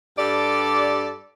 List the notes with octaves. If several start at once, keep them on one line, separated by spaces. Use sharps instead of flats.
G2 G4 A4 D5